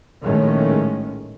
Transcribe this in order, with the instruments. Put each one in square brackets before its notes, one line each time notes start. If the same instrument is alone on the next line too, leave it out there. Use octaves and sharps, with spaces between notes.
[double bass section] A#1 A2 D#3 G#3 A3 C#4